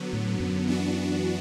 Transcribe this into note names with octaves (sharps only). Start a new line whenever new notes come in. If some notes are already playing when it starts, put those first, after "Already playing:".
Already playing: D3 F#3 B3
A2
F#2
E3 B3 D4 F#4